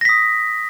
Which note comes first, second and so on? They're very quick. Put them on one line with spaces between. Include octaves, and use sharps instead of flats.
A#6 B6 D#6